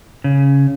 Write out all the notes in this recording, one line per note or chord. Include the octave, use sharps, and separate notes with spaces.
C#3